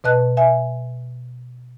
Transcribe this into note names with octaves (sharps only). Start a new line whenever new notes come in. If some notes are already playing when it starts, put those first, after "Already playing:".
B2 B4 D#5 A5 F#6
E5 G#5